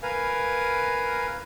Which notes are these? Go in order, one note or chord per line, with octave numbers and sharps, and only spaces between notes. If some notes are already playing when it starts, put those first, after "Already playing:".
A#4 B4 F5 G#5